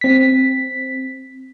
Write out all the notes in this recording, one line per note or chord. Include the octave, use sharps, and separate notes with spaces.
C4 B6